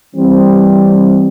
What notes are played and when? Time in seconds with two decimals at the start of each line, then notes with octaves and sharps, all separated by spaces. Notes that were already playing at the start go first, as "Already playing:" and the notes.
0.14 E3 G3 C4